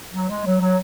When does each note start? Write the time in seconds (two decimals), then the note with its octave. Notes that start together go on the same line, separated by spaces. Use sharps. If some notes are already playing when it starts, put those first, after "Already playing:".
0.14 F#3
0.29 G#3
0.45 F#3
0.61 F#3